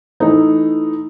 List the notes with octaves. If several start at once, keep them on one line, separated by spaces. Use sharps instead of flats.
E3 A3 D#4